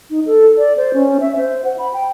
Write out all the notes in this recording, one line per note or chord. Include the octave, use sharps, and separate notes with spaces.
D#4
A4
D5
C5
C#4
E5
C5
F#5
B5
G5